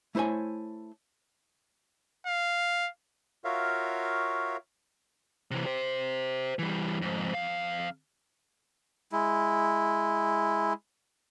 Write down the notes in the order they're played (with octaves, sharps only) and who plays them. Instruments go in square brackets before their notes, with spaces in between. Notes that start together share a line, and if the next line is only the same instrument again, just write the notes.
[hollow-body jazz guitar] A3 E4 C5 C#5 G#5
[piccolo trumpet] F5
[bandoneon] F4 F#4 A#4 C#5 E5 F5
[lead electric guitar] C3 E3
G4 C5
E3 G3
F2 G#2
F2 F5
[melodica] G#3 E4